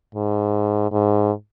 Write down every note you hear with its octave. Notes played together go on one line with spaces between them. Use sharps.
G#2
G#2